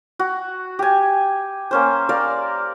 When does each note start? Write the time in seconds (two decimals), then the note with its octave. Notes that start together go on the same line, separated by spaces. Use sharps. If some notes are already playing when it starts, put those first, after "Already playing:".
0.19 F#4
0.79 G4 G#5
1.71 A#3 C#4 C5
2.09 A#4 D5 F5